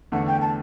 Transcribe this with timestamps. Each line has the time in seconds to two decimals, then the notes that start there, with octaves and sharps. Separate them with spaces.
0.12 E2 D3 A3 F#5
0.27 G5
0.42 A5